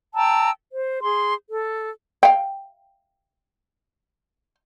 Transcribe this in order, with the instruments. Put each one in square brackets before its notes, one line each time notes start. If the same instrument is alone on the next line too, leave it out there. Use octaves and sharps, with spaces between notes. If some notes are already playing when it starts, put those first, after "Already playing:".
[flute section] G5 A5 A#5 E6
C5
G#4 C6
A4
[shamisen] F5 G5